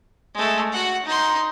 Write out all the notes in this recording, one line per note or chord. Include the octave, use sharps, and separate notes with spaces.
G#3 A3
F#4 F#5
D#4 C6